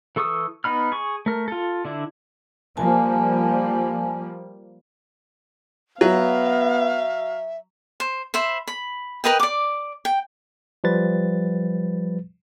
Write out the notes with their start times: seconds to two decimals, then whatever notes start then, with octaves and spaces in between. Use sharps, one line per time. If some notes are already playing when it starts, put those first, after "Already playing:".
0.16 E3 A4 C#6 D#6 E6
0.64 B3 D#4 B5 F6
0.92 G#4 C#6
1.26 A3 A#4
1.48 F4 A4
1.85 D3 D4 E4
2.77 F3 G3 A#3 G#5 A5
6.01 F#3 B3 E5 F5
8.00 C5
8.34 C5 E5 B5
8.67 B5
9.24 A#4 B4 D#5 G5
9.40 D5 D6
10.05 G5
10.84 F3 G3 B4 A6